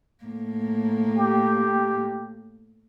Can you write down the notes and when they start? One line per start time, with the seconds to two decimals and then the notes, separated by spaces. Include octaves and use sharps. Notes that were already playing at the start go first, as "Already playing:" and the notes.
0.24 A2 A#3
1.16 G4